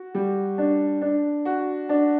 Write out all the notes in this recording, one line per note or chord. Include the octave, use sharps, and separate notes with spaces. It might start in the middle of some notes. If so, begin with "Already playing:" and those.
Already playing: F#4
G3
D4
D4
F#4
D4